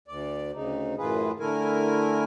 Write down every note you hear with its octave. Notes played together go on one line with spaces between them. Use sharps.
D2 D5
D2 C#3 D#4
F#2 A2 E3 F4 G#4 B4
D3 A3 E4 A#4 G#5